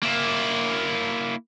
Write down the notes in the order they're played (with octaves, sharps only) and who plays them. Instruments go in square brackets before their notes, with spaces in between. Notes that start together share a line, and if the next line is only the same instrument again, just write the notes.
[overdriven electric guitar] A#3 E4